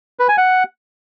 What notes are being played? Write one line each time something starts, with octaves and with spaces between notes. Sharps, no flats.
B4
G#5
F#5